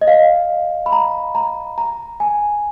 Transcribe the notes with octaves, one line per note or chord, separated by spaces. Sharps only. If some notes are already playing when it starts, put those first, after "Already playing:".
D#5
F5
B5
A#5
A#5
A#5
G#5